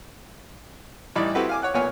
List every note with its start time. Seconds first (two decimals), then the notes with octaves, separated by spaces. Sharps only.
1.16 A1 E3 G3 D#4 D5 B5
1.35 C4 E4 F#4 G4 A4 B4
1.49 F5 G#5 D6
1.62 C#5 F#5 F#6
1.74 B1 A#2 B3 C#5 G#5 F6